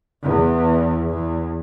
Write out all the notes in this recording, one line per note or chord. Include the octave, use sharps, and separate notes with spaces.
E2
E2